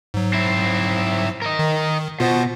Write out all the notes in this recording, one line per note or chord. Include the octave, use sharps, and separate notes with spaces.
G#2 F#3
C4 E4
A#4 D#5
D#3
B2 F4 C5 F#5